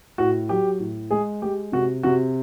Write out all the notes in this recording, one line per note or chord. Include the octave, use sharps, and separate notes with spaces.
A2 F#4
F#3 G4
A2
G#3 G#4
G#3 G4
C3 F#4
C3 F#4